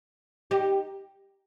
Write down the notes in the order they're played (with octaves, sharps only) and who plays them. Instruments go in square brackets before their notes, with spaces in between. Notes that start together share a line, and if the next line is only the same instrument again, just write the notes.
[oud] D#4 G4